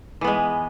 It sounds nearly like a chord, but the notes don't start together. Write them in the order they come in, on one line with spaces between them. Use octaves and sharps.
E3 B3 G#3